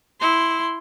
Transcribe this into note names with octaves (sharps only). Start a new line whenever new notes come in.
E4 C6